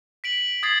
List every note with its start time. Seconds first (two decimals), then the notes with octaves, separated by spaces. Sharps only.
0.24 B6 D7 F#7
0.63 D#6 G#6 A6 C7 F#7